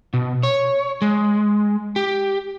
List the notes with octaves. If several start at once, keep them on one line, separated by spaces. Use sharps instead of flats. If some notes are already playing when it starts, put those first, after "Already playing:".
B2
C#5
G#3
G4